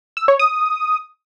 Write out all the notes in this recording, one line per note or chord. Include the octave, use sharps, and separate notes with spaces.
E6
C#5
D#6